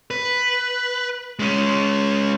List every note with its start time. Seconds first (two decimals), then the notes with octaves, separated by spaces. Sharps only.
0.11 B4
1.39 G#3 C#4